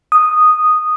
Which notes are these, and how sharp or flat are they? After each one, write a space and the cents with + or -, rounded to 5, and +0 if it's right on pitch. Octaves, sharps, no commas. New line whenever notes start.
D#6 -5